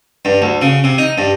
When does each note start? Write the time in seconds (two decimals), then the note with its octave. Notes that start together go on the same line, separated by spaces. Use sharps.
0.25 G2
0.42 D2
0.62 C#3
0.84 C3
0.98 D#4
1.18 G2